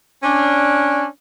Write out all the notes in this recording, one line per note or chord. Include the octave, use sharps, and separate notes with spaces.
C#4 D4